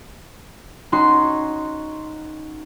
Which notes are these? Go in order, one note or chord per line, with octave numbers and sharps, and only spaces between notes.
C#4 D#4 F#4 C6